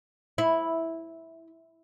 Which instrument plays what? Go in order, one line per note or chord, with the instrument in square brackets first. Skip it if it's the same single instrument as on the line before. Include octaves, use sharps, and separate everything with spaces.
[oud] E4